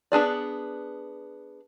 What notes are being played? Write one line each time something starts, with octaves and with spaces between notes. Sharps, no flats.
B3 D4 G#4 D5